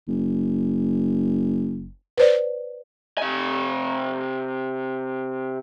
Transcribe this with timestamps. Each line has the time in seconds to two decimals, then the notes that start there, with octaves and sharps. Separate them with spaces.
0.08 F#1
2.18 B4 C5 D5
3.18 C3 G#5